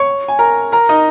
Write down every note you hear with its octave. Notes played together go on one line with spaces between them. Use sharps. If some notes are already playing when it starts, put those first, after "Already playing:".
Already playing: C#5 C#6
G#5
A#4 A#5
A#4 A#5
D#4 D#5